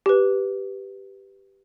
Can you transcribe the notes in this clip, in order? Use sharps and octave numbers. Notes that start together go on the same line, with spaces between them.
G4 B4